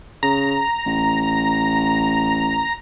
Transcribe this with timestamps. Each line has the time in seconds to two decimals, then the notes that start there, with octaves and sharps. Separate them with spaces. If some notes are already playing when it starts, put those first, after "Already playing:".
0.23 C#3 A#5
0.86 A1